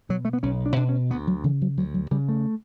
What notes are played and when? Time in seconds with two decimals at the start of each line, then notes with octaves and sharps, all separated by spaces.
0.09 B2 F#3
0.25 A3
0.33 B3
0.43 B1 C#4
0.66 D4
0.76 B2 D4
0.89 C#4
1.10 D2 B3
1.27 F#3
1.44 C#3 E3
1.61 F#3
1.77 D2 F#3
1.94 F#3
2.11 C#3 G3
2.29 A3